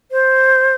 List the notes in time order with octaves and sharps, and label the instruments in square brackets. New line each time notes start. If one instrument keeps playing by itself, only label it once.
[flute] C5